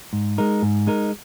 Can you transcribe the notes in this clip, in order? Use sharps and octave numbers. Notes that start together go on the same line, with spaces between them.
G#2
G#3 D#4 A#4
G#2
G#3 D#4 A#4